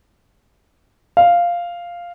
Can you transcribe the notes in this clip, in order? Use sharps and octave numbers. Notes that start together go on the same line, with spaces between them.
F5